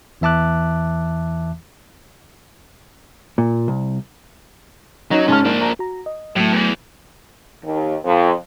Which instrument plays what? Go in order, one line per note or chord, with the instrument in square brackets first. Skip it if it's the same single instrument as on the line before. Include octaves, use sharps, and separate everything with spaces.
[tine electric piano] E2 E3 E5 A5 D6 F#6
[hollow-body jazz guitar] A#2
C2
[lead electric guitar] F#3 [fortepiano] C#4 D#4
[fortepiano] G#2 A5 F6 [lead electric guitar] C#4
[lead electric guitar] A#3 D4
[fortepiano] A#5
[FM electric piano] F#4 A#5
D#5
[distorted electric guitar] A2 [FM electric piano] F#3 A3
[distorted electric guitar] E2
[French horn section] D#2
F2